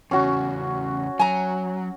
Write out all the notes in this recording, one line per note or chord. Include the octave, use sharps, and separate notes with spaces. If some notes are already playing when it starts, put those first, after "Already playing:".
E2 C#3 C#4 F#4
F#3 G#5 A#5